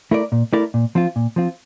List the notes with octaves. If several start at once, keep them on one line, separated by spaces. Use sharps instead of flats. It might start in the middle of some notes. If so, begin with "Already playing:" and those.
A3 E4 A#4 D5
A#2
A3 E4 A#4 D5
A#2
F3 C4 F4
A#2
F3 C4 F4